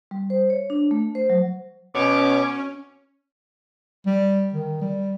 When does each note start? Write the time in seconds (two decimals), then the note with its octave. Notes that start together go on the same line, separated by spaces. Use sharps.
0.11 G3
0.30 C5
0.50 C#5
0.70 D4
0.91 A3
1.15 C5
1.30 F#3
1.96 B2 C#4 C#5 D6
4.06 G3
4.54 D#3
4.81 G3